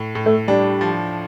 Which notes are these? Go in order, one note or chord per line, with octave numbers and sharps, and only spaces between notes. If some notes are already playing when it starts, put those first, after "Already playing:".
Already playing: A2
A2
A3
G3 D4
F3